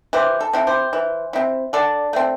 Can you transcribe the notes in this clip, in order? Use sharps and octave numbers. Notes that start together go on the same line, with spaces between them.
E3 G4 C5
A4
C4 E4
G4 C5
E3
C4 E4
D3 A4 D5
A3 C4